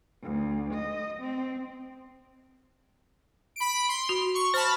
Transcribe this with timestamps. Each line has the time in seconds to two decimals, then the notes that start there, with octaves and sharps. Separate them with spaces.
0.22 D2
0.74 D#5
1.20 C4
3.56 B5 D7
3.89 C6
4.09 F#4
4.35 C#6
4.54 C5 A5 B5 F6